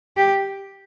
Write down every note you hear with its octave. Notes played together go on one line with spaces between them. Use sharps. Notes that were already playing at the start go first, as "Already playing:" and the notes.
G4